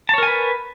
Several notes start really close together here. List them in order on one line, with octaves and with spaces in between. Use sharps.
A5 C#5 A#4 G#5 B4